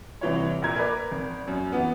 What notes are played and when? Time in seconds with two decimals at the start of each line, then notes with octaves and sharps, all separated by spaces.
0.21 C2 E3 C#5
0.62 A#1 A#2 A#5 G#6
0.76 A#4 B4 D5
1.11 G#1
1.47 F#2
1.72 E3 B3